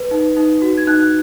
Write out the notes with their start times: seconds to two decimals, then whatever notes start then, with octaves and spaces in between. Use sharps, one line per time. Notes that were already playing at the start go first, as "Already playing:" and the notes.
Already playing: B4
0.11 D#4
0.37 D#4
0.62 F#4
0.78 G#6
0.87 D#4 F#6